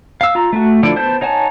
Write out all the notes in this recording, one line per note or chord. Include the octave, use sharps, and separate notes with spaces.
F5 E6
F4 A#5
A3 F#4
D3 F3 E4 D5
B3 C5 A5 G6
D#4 C#5 F#5 G#5 A5